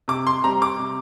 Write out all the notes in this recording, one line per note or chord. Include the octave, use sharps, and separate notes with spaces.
C3 D6
C6
G3 C4 A#5
D6
C3